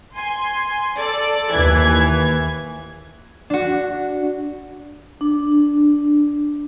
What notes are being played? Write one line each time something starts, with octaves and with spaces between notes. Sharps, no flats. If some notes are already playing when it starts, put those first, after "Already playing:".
G#5 C6
A4 D5
D#2 E3 G#6
D4 F#4
D4